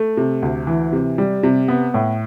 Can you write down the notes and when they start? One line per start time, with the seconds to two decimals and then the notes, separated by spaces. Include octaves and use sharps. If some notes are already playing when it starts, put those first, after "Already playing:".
Already playing: A3
0.17 C3
0.42 D2
0.67 E3
0.93 C3
1.18 G3
1.43 C3
1.68 B3
1.94 A2